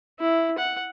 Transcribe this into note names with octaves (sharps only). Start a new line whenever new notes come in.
E4
F#5